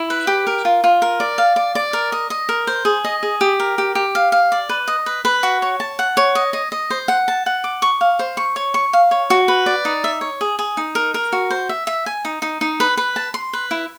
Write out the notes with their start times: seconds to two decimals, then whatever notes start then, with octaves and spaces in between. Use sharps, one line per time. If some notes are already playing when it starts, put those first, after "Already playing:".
Already playing: E4
0.10 B4
0.27 G4
0.47 A#4
0.65 F4
0.84 F4
1.02 A#4
1.20 D5
1.38 F5
1.56 D5
1.75 D5
1.93 A#4
2.12 D#5
2.30 D#5
2.49 A#4
2.67 C5
2.85 G#4
3.05 D#5
3.23 G#4
3.41 G4
3.60 A#4
3.78 G4
3.95 G4
4.15 F5
4.32 F5
4.52 D5
4.69 B4
4.88 D#5
5.06 B4
5.25 B4
5.43 F#4
5.62 C#5
5.80 A5
5.99 F#5
6.17 C#5
6.35 D#5
6.53 D#5
6.72 D#5
6.90 C5
7.08 F#5
7.28 A5
7.46 F#5
7.64 D6
7.82 C#6
8.01 F5
8.19 C5
8.37 C#6
8.56 C#5
8.74 C#6
8.93 F5
9.11 C#5
9.30 F#4
9.48 B4
9.66 D5
9.85 D#4
10.04 E5
10.21 C#5
10.41 G#4
10.59 G#4
10.77 D#4
10.95 A#4
11.14 A#4
11.32 F#4
11.50 C5
11.69 E5
11.87 E5
12.06 G#5
12.25 D#4
12.42 D#4
12.61 D#4
12.80 B4
12.97 B4
13.16 A5
13.34 C6
13.53 B4
13.71 E4